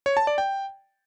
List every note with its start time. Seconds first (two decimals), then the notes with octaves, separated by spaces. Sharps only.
0.06 C#5
0.17 A5
0.27 D5
0.38 G5